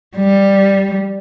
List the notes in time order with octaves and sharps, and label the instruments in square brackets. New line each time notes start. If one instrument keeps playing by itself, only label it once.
[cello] G3